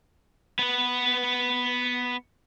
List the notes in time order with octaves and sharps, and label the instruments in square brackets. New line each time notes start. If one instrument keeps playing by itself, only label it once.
[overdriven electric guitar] B3 B4